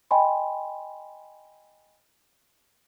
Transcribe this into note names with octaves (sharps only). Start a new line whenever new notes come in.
D#5 G5 G#5 B5 C6